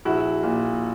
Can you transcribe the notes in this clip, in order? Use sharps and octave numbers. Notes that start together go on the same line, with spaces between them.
A#1 E4 F#4
A#2